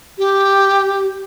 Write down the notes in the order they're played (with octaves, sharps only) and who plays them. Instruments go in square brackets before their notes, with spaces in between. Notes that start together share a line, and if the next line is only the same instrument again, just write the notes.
[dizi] G4